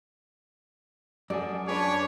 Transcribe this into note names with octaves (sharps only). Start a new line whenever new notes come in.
F#2 G#4 A4 D5
D4 G#4 B4 C#5 D5